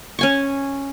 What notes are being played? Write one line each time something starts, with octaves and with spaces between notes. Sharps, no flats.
C#4 G#5 C#6